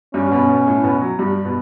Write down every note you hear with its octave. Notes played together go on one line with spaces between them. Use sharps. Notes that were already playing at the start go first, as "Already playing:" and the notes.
G2 G3 C#4
B2 B3
B2 B3
A2 A3
B2 B3
F#3
G2 G3
B2 B3